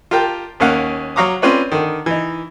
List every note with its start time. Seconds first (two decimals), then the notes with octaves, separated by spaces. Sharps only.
0.11 F4 G4 A#4 G5 A5
0.60 D#2 A#3 C#4 F5 F#5
1.16 F#3 C#5 F5 A#5 D6 D#6
1.42 C4 C#4 F4 B4 C#5 D5
1.72 D3 D#3
2.06 E3 D#4